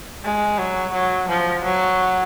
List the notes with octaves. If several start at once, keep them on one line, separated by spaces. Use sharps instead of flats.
G#3
F#3
F#3
F3
F#3